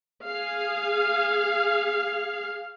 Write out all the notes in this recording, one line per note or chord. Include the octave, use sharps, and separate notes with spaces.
G#4 F5